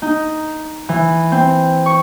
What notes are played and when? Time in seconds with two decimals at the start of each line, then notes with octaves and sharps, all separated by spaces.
0.02 D#4
0.89 E3
1.32 C4
1.86 C#6